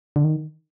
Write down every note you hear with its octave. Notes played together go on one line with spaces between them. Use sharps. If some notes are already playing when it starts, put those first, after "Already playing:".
D3
D#3